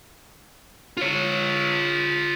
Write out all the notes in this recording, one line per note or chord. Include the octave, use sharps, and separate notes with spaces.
F4 C#5